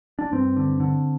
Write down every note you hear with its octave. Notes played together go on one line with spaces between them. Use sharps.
D4
G2 C4
D3
D3